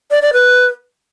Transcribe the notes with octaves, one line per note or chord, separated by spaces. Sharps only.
D5
D5
B4